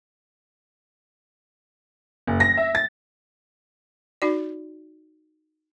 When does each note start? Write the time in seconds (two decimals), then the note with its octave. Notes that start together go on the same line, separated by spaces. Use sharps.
2.27 F#1
2.40 A#6
2.57 E5
2.75 A6
4.22 D#4 F#4 D5